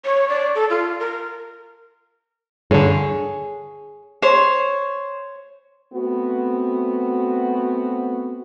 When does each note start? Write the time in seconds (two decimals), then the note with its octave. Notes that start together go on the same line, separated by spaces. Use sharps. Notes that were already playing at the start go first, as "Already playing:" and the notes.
0.05 C#5
0.29 D5
0.55 A4
0.70 F4
1.00 A#4
2.71 G2 D3 G#4 C#5
4.22 C5 C#5
5.93 A3 B3 C4 F#4